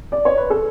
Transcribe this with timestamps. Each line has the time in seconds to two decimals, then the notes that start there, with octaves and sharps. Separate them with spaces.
0.12 D5
0.25 C#5
0.37 B4
0.50 A4